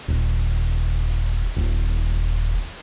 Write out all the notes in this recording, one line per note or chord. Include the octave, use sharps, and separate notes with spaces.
D#1
D#1